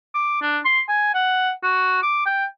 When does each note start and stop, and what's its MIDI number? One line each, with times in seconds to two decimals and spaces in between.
0.14 0.37 86
0.41 0.59 62
0.65 0.81 84
0.89 1.11 80
1.14 1.50 78
1.63 2.02 66
2.03 2.26 86
2.26 2.46 79